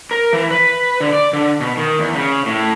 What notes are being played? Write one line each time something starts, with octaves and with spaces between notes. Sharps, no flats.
A#4
E3
B4
D3
D5
D3
B2
D#3
E2
C#3
A2